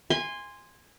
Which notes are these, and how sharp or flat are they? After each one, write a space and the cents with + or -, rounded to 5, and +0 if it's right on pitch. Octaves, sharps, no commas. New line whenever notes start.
G#5 -20 C6 +0